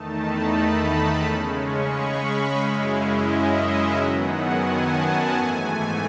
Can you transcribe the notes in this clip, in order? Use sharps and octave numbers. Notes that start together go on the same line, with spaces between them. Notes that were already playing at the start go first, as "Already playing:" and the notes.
Already playing: E2 D#3 A3 D#4 A5
B5
B5
C#3 G#3 C#4
C#6
B5
F#2 C#3 G#3 C#4 E4
D#5
E5
F#2 D#3 F#3 B3 F#5
G#5
A5
G#2 E3 A3 G#5